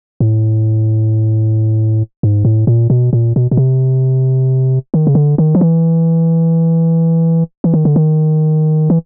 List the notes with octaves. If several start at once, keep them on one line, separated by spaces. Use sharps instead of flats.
A2
G#2
A2
A#2
B2
A#2
B2
B2
C3
D#3
C#3
D3
D#3
F3
E3
E3
D#3
D3
D#3
E3